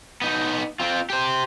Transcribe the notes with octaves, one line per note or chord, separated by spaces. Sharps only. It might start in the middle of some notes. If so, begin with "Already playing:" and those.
B3 D#4
C4 F4
G4 C5